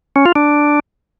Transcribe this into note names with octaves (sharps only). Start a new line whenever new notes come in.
C#4
F4
D4